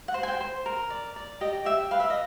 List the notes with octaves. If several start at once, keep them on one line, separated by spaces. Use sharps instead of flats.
F#5
C5
G#5
G5
C5
A#4
D5
D5
G4 D#5
G4 E5
B4 F5
E5
D#5